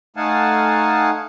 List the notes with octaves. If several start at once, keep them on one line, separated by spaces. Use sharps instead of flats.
A3 D#4 F5 F#5 G#5 A5